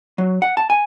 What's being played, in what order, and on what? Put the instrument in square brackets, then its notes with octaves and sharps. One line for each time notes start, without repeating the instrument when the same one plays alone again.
[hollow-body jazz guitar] F#3
F#5
A5
G#5